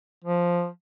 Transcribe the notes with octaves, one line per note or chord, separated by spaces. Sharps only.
F3